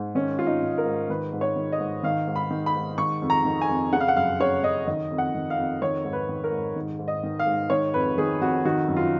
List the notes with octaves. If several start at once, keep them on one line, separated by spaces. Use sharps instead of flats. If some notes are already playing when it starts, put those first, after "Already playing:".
Already playing: G#2
D#3 C#4
G#2 F4
D#4
D#3
A#4
G#2
D#3 B4
G#2
C#5
D#3
D#5
G#2
D#3 F5
G#2
B5
D#3
B5
G#2
D#3 C#6
F2
A#5
D#3
G#5
F2
C#3 F#5
F5
F#5
F#2 F5
C#3 C#5
F#2 D#5
D#3 D#5
F2
F#5
D#3
F5
F2
D#3 C#5
G#2
B4
D#3
A#4
G#2
D#3
G#2
D#5
D#3
F5
G#2
D#3 C#5
F2 B4
D#3 G#4
F2 F#4
D#3 F#4
F#2
F4